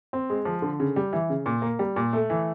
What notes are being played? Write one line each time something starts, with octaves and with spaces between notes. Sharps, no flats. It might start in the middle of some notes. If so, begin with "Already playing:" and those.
C4
G#3
F3
D3
C#3
G3
E3
C#3
A#2
A#3
G3
A#2
A3
E3